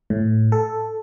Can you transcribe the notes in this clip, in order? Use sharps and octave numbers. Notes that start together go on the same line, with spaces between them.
A2
A4